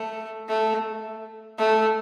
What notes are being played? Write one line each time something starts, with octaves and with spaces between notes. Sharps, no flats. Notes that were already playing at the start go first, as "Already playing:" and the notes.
Already playing: A3
A3
A3